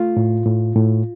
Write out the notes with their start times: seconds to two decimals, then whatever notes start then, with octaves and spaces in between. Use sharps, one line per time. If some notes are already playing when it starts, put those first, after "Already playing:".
Already playing: A3 F4
0.17 A2
0.46 A2
0.76 A2